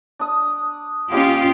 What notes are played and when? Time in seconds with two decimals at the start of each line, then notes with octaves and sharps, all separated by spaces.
0.19 D4 D#6
1.11 F3 A#3 C#4 F4 G4 D#5